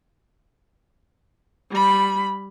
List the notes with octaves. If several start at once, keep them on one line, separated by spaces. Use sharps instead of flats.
G3 B5